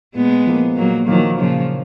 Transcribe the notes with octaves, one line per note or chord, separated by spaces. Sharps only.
A#2 G#3 B3
F3 A#3
A#2 F#3 A#3
D#3 F3 F#3 A#3
A#2 C#3 F3